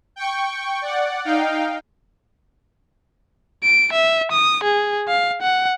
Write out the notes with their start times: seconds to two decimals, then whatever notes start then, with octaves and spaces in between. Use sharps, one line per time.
0.16 G5 C#6
0.82 D5 F#5
1.25 D#4 F5 G5
3.64 D7
3.93 E5
4.32 D#6
4.64 G#4
5.08 F5
5.42 F#5